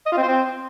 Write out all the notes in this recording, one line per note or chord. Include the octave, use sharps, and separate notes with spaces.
D#5
F4
C4
C5
C4